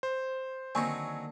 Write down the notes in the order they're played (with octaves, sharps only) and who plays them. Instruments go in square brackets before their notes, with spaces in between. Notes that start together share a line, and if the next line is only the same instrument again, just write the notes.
[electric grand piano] C5
[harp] D3 D#3 A#3 [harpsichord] F#3 C4 D#4 [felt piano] G#5 C#6